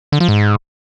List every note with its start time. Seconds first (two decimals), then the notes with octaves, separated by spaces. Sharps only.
0.12 D3
0.20 F3
0.28 G#2